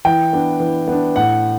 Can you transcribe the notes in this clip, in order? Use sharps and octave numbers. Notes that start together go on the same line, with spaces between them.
E3 G5
B3 D4
E3
B3 D4
A2 F#5